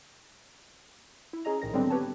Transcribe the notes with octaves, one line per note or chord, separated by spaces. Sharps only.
E4
C#4 G#4 D#5 A#5
A#1 A2 D#3 A#6
D3 F#3 G3 B3 C4 D4
G4 B4 C#5 A5